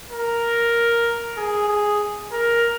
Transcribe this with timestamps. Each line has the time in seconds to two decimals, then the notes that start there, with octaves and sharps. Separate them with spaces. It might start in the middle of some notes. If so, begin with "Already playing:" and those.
0.11 A#4
1.37 G#4
1.68 G#4
2.32 A#4